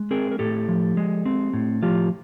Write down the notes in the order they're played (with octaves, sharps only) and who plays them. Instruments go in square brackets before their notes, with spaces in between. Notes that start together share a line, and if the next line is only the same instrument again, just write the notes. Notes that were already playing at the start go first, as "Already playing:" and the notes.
Already playing: [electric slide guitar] G#3
C4 G#4 A#4
A#4
A2 G4 A4
F3
G#3
C4
A2
F3 F4 G4